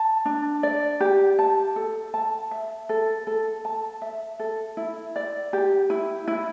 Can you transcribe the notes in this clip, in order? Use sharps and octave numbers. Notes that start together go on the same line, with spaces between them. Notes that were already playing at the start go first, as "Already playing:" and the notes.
Already playing: A5
D4
D5
G4
A5
A4
A5
E5
A4
A4
A5
E5
A4
E4
D5
G4
E4
E4